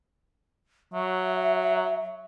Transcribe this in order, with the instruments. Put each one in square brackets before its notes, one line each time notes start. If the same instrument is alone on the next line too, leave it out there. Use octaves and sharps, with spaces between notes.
[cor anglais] F#3 [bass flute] E5